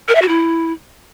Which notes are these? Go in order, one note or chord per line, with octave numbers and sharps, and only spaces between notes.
A#4
E5
F#4
E4